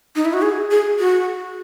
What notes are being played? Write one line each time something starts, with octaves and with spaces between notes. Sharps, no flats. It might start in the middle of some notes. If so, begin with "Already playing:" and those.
D#4
E4
F#4
G#4
G#4
F#4